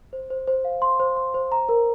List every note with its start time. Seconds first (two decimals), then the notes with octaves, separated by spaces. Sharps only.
0.13 C5
0.30 C5
0.47 C5
0.65 F5
0.82 C6
1.00 C5
1.16 C6
1.34 C5
1.52 A#5
1.69 A#4